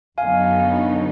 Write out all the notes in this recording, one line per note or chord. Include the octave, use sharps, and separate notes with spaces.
F#2 D3 F#3 B3 D#4 F5 G#5